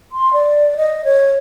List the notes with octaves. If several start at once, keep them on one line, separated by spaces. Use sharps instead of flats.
C6
D5
D#5
C#5